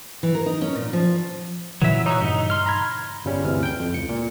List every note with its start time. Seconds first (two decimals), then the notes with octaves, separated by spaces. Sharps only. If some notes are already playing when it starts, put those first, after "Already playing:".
0.23 E3
0.35 A#4
0.46 D#4
0.62 C#4
0.75 A#2
0.93 F3
1.82 A#2 C#3 E3 F#3 E5
2.06 D#4 F#4 C#5 A#5 E6
2.21 G2 D#4
2.50 C6 F6
2.66 A#5 B5 G#6
3.25 G1 C#3 G3 C#4
3.44 D2 C3 E3 F6
3.63 G5 G6
3.79 F2
3.93 C#2 C#7
4.09 A#2